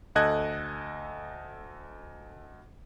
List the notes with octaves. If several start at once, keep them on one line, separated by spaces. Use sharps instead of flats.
D2 A4 D#5 F#6 G#6